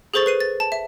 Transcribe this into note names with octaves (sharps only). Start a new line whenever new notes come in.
G#4 A4 C5 C#6 A6
B4 C7 D#7
A6
A5
E5